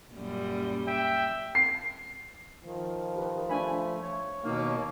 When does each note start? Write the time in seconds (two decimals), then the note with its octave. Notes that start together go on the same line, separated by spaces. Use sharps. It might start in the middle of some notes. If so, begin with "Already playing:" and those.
0.15 F#2 A#2 G3
0.87 G4 E5 G5
1.55 C7
2.64 D#3 F3
3.16 G4 B4
3.49 A3 D4 G#5 B5
4.03 C#5
4.44 D#2 B2 A#3 D#4 F5